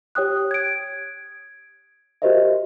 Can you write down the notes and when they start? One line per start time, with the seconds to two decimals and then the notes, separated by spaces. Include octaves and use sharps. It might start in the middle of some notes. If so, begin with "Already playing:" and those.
0.15 G4 C#5 G5 D#6 F#6
0.51 G#6 D7
2.22 F#4 G4 A#4 C5 D#5 E5